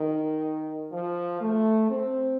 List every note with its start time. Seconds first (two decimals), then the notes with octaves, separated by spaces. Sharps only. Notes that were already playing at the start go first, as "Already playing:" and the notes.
Already playing: D#3
0.91 F3
1.41 A3
1.89 C4